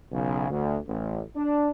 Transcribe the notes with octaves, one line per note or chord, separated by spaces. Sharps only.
B1 C#3
D2
A1
D4